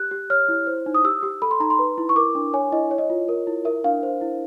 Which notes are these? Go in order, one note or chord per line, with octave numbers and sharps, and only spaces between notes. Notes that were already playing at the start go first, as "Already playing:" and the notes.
Already playing: G4 F#6
G4
C#5 F6
E4
C5
D#4
D#6
G4 E6
G4
A4 B5
C6
D#4 A#5
C6
B4
E4
C#6
A#4 D6
D4
C#5 G#5
E4 D#5
C#5
D#5
F4
A#4
E4
A#4 E5
D4 F5
C5
E4